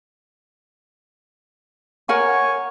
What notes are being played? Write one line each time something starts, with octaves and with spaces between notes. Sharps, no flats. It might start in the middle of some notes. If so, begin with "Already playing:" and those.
A#4 C#5 F#5 G#5